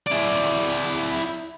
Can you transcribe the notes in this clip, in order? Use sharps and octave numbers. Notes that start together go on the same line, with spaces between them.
E4 D5